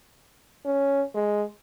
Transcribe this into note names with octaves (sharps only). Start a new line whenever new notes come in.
C#4
G#3